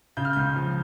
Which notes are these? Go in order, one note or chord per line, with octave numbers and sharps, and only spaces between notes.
C#3 G6
F6
C#2 G6
F3